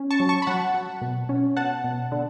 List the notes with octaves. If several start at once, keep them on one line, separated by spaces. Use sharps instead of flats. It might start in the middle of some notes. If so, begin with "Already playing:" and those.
Already playing: C#4
A5 C#6
F#3
A5 C#6
B5
F#3 F#5 A5
F#3
B2
C#4
B2 F#5 A5
B2
D3